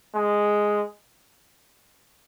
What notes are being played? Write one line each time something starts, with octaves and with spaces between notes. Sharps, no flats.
G#3